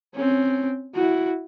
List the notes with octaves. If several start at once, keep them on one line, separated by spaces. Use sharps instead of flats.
C4 C#4
E4 F#4